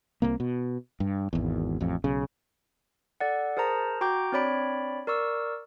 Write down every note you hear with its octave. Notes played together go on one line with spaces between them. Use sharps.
C2 C3 A#3
B2
G2
G#1 E2
A1 F2
B1 C#3
A4 D5 F#5
G#4 A#4 C5 A5 A#5
F#4 G5 A#5 D6 G6
C4 D4 C#5 D5 B5 D7
A#4 D5 C#6 E6